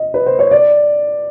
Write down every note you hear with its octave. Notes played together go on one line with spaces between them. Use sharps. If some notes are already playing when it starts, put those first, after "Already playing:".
Already playing: D#5
B4
C5
C#5
D5